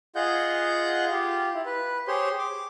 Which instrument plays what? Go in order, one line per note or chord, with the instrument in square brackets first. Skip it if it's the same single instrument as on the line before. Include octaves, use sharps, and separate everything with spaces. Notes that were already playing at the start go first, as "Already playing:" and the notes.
[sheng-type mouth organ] F4 G#4 D#5 F#5 G6
F4 G4
E4
B4
G4 G#4 C5 C#5 C6
D6